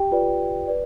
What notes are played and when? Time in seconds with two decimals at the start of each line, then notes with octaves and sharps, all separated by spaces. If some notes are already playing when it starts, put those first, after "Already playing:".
Already playing: G4 G5
0.12 F4 B4 D5
0.68 B4 D5